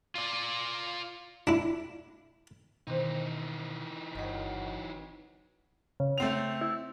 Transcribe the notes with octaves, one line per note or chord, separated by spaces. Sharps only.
F4 D5
D4 E4
B2 D#3 E3 C4 D#4
G1 D#3 F#3 D#5
C#3
A3 C4 F7
E4